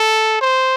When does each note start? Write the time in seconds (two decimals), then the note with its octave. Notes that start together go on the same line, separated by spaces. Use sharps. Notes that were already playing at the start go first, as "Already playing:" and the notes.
Already playing: A4
0.41 C5